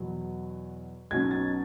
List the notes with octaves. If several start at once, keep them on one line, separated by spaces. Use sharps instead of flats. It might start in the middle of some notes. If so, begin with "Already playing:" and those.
Already playing: E2 B2 F#3
B1 B2 F#3 C#4 G#6
A6